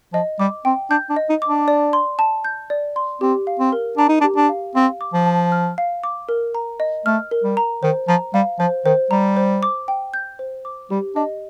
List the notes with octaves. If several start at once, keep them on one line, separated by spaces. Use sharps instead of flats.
F3 D#5
G3 D6
C4 G5
D4 G6
D4
D#5
D#4
D6
D4
D5
C6
A5
G6
D5
C6
C4 G4
F5
C4
A#4
D4 A#5
D#4
D4
G4
D4
F5
C4 F5
D6
F3
A5
F6
F5
D6
A#4
A#5
D#5
A3 F6
A#4
G3
A#5
D#3 C5
F3 A#5
G3 F5
F3 C5
D#3 C5
G3 A#5
C5
D6
G5
G6
C5
D6
G3 G4
D4 D#5